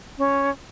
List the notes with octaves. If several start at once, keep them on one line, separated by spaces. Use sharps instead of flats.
C#4